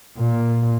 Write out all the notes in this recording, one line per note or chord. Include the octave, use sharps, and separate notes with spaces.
A#2